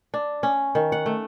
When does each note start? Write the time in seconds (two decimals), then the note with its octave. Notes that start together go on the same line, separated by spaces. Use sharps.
0.14 D4
0.43 C#4
0.75 D#3
0.92 F#5
1.06 A3